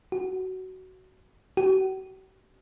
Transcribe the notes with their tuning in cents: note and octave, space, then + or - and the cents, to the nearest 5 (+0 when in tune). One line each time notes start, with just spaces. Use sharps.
F#4 +15
F#4 +45